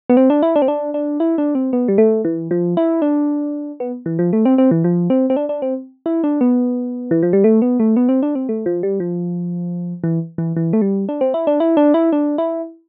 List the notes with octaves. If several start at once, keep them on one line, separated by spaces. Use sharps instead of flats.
B3
C4
D4
E4
D4
C4
D4
D4
E4
D4
C4
B3
G3
A3
E3
F3
E4
D4
B3
E3
F3
A3
C4
C4
E3
F3
C4
C4
D4
D4
C4
E4
D4
B3
E3
F3
G3
A3
B3
A3
B3
C4
D4
C4
A3
F3
G3
F3
E3
E3
E3
A3
G3
D4
C4
E4
D4
E4
D4
E4
D4
E4